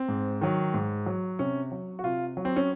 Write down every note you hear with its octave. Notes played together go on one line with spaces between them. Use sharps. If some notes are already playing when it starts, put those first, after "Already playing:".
Already playing: C4
G#2
D#3 F#3
G#2
F#3
C3 C#4
F#3
F#4
C3 F4
F#3
C4
C#4